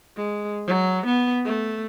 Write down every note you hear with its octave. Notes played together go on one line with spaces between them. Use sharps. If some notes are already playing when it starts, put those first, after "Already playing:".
G#3
F#3
B3
A3